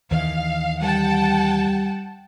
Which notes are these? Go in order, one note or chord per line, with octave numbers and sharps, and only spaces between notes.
D#2 D#3 E3 F5
G3 F#5 G5 A5